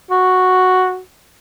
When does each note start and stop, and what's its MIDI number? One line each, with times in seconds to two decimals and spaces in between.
0.10 1.00 66